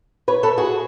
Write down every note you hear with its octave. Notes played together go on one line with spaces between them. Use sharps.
B4 C#5
A4 B4
F#4 G#4